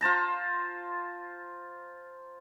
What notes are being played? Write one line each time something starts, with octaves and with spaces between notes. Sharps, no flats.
F4 C5 A5 A#5